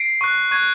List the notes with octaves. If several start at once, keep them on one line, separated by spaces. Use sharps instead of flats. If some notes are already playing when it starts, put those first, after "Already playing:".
Already playing: C7 D7
C#6 F#6
C#6 F#6 G#6